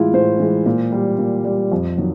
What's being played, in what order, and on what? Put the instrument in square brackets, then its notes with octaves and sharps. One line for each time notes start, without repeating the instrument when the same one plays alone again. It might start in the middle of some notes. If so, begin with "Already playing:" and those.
Already playing: [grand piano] A2 E3 G#3 E4 F4
A2 C5
E3 G#3
A#2
G3
A#2
G3
F2
D#3 F#3